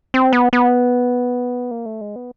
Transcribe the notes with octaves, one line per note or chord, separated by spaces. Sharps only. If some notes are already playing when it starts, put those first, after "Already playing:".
C4
B3
B3
A#3
A3
G#3
B3